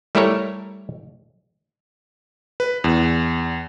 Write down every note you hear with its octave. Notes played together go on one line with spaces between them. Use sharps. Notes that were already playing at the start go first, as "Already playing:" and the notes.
G3 A3 E4 A4 A#4 C#5
B4
E2